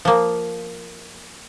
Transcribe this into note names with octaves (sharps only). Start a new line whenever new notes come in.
F3 A#3